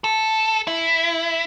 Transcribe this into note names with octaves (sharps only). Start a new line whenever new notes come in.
A4
E4